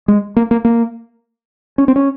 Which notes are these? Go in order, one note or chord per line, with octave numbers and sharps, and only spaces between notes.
G#3
A#3
A#3
A#3
C#4
C4
C#4